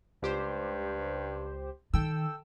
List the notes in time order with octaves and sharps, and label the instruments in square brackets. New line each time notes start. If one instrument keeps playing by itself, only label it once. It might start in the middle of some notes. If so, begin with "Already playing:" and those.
[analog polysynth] C#2 G4 C5 [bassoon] G2
[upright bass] D#3 [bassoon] A4 [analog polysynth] G5 E6